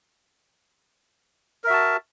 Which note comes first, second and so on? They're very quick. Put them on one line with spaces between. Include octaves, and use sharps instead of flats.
A#4 E5 F#4 A5